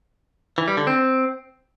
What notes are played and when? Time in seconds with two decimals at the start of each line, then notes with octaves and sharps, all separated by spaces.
0.58 E3
0.68 G3
0.77 D3
0.87 C4